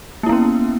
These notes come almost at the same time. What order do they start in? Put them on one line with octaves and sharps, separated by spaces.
A#3 E4 B3 C#4